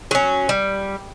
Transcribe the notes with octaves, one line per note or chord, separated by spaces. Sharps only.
F#3 C#4
G3